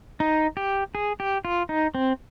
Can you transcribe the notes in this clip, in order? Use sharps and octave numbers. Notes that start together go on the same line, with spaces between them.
D#4
G4
G#4
G4
F4
D#4
C4